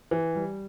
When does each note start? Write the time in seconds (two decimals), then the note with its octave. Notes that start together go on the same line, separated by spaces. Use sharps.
0.11 E3
0.35 G3